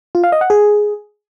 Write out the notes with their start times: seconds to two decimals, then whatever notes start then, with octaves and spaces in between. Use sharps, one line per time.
0.15 F4
0.24 F5
0.32 D#5
0.41 F#5
0.50 G#4